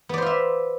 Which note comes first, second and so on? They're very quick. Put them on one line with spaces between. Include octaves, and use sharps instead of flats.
B3 D5 C5 F4 E5